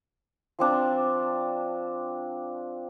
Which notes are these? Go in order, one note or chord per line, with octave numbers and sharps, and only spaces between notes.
F3 C4 D4